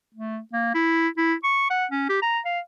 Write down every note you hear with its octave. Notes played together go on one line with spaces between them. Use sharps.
A3
A#3
E4
E4
C#6
F#5
C#4
G4
A#5
F5